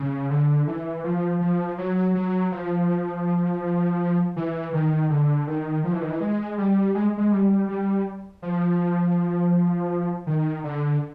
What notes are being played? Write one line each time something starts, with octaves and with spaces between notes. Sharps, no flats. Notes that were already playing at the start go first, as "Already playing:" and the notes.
Already playing: C#3
D3
E3
F3
F3
F#3
F#3
F3
E3
D#3
D3
D#3
F3
E3
D#3
E3
G#3
G3
G#3
G#3
G3
G3
F3
D#3
D3